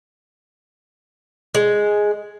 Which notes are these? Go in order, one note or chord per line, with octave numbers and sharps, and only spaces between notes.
G#3